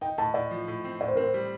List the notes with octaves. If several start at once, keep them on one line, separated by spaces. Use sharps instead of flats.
D#4 G5
A2 A5
A2 D5
F3
A2
C4
A2 D5
C5
C4 A#4
C5
G3